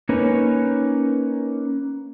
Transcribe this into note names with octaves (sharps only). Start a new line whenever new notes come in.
A#3 C#4 D#4 A#4 B4 C#5